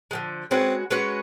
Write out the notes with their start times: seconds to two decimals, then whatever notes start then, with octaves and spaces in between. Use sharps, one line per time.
0.11 D3 F3 G#3
0.51 G#3 C4 C#4 F#4 B4
0.91 G#3 C#4 F#4 B4